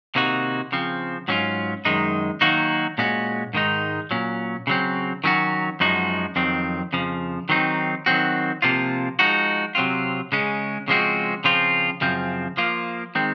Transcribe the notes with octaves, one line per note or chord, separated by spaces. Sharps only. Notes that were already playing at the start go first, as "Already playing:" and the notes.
C3 D#3 A#3 D#4 F#4
C#3 F3 C4
G#2 F#3 C#4 F4
F#2 D#3 G#3 D#4
D#3 F#3 A#3 D#4 F#4
A#2 G#3 C#4 F#4
G#2 D#3 G#3 D#4
A#2 F#3 C#4
C#3 F#3 C4
D#3 F#3 C#4 F#4
F#2 F3 G#3 D#4 F#4
F2 D#3 F#3 C4
F2 C#3 F3
D#3 F#3 C4 D#4
D#3 F#3 C4 F#4
C3 F3 A#3 F4
F3 G#3 D#4 F#4
C3 F#3 C4 F4
C#3 G#3 C#4
C#3 F3 G#3 C4 F#4
C#3 F3 C4 F4
F#2 C#3 F3 C4
F3 A#3 F4
D#3 G#3 C4